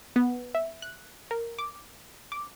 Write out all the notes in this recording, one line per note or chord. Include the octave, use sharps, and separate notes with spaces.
B3
E5
F#6
A#4
D6
D6